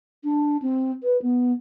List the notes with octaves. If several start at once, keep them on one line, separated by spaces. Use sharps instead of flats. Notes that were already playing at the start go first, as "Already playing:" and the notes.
D4
C4
B4
B3